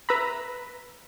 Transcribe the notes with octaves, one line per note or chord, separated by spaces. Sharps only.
B4 E5 A#5 B5